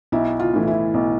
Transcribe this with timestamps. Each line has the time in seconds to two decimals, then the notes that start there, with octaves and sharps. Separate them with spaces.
0.12 B1 E4
0.40 F4
0.53 A2 E3
0.67 E4
0.94 B1